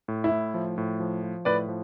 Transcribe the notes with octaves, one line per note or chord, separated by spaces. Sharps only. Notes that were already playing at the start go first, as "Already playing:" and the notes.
A2
E4
A2
F3
A2
F3
F3
A2 B4 D5
F3